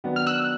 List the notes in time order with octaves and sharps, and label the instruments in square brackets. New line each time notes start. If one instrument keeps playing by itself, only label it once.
[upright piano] D#3 F#3 B3 D4
[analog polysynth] F6
E6 F#6